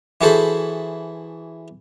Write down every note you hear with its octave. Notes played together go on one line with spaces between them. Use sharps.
E3 F#4 G#4 A4 C5 B5